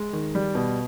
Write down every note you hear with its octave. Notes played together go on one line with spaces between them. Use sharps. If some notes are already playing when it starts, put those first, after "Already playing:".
Already playing: G#3
D#3
G3
B2